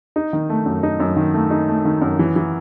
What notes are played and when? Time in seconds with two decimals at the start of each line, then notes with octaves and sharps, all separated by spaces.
0.16 D#4
0.33 D#3
0.50 A3
0.66 F#2
0.83 D#4
1.00 F#2
1.17 D#3
1.34 A3
1.50 D#4
1.68 A3
1.85 D#3
2.02 F#2
2.19 E3
2.36 E3